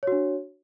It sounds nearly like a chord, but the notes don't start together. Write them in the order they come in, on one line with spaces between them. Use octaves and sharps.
C#5 F#4 D4